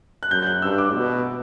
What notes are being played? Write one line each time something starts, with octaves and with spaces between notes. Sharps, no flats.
F#6
F#2 G6
G6
F#6
G2 E6
D6
B2